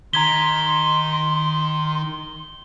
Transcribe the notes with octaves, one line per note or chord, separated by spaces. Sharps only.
D#3 D#4 A#5 C6 G#6 B6 G7